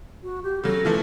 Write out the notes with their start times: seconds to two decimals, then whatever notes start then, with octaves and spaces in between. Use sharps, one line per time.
0.23 F#4
0.43 G4
0.64 C#3 F#3 A4
0.85 E3 F3 A3